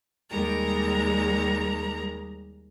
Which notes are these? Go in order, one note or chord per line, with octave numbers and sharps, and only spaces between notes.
D#2 G3 G#3 A#4 A#5